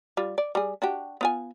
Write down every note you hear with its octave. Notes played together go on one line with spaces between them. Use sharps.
G3 F4
D5
G3 G#4
D4 F#4 G4
B3 F4 G#5